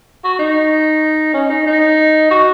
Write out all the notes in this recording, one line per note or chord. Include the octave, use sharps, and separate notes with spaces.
F#4
D#4
C#4
D#4
D#4
F#4